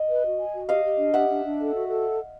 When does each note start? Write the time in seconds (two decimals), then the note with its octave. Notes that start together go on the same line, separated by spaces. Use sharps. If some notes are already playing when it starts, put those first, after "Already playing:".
Already playing: D#5
0.09 B4
0.25 F#4
0.39 G#5
0.55 F#4
0.69 G4 D#5 F5
0.84 G4
0.98 D4
1.13 G4 E5 F#5
1.29 D4
1.44 D4
1.59 A4
1.73 F#4
1.88 A4